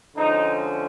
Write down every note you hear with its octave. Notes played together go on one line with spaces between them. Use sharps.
D3 F3 G#3 C#4 D#4